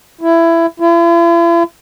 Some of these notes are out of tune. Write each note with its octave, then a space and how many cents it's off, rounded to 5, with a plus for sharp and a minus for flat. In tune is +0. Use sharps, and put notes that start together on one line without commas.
E4 +15
E4 +45